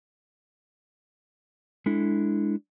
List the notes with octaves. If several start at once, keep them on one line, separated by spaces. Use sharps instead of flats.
G#3 D4 E4 A4